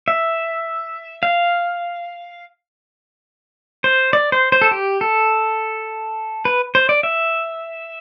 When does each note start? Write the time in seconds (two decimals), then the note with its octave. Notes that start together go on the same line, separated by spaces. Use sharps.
0.08 E5
1.23 F5
3.84 C5
4.13 D5
4.32 C5
4.52 C5
4.62 A4
4.71 G4
5.01 A4
6.45 B4
6.75 C5
6.89 D5
7.03 E5